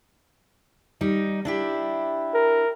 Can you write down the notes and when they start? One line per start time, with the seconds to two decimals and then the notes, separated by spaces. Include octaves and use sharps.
1.01 G3 D#4
1.45 D4 E4 G4
2.34 A#4